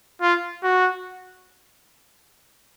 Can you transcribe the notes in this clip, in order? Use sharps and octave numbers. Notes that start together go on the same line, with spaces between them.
F4
F#4